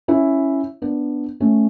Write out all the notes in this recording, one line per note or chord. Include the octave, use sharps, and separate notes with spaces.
C#4 E4
B3 D4
A3 C#4